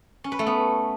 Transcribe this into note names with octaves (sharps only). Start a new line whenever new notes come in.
C#4
B4
A3
B3